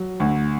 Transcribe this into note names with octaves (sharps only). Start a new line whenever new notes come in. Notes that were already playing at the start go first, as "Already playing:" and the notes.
Already playing: F#3
D2